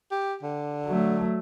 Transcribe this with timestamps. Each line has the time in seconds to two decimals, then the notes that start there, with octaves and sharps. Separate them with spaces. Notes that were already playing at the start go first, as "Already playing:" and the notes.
0.11 G4
0.43 D3
0.86 F#3 A3